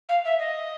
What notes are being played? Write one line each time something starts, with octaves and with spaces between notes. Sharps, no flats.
F5
E5
D#5